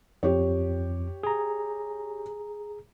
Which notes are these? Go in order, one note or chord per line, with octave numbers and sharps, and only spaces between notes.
F2 G4 C#5
G#4 A#5